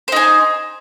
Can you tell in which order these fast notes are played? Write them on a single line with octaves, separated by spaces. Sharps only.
C5 D#4 G#4